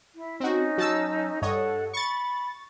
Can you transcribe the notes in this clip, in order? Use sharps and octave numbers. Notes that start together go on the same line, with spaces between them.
E4
C4 C#4 D#4 F#4
F#3 A5 E6
G2 A4 C#5 D#5 F#5
B5 C#6 A6